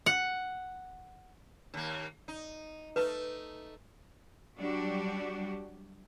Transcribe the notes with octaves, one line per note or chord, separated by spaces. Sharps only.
F#5
D#2 A#3
D#4
A3 D#4 B4
F#3 G3 D4 F#4 G4